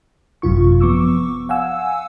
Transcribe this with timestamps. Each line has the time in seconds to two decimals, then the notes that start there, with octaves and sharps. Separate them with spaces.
0.42 G#1 F#2 C3 F4 C#6
0.80 F3 B3 C#6 D6 E6
1.49 F5 F#5 G#5 E6